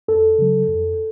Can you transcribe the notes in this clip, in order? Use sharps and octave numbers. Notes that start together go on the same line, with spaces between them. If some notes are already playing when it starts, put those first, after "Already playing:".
F2 A4
C#3 F#3
F2